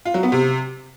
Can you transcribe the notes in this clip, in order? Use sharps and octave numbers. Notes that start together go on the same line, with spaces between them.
F4
F#3
B3
C3